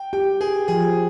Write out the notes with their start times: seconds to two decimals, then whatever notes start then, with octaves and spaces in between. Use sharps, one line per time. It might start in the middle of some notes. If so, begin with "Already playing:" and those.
Already playing: G5
0.13 G4 G5
0.41 G4 G#4
0.68 F3 G#4